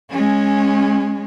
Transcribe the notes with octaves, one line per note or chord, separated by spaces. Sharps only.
G#3 C#4